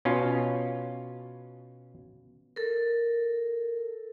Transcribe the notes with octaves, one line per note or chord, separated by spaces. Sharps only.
B2 C#4 F4
A4 A#4